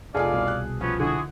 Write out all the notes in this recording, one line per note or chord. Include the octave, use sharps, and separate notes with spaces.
F1 F4 G#4 A4 D5 F5 G#5
C2 B2
F#6
C3 F3 B3 C#4
D3 E4 F#4 G#4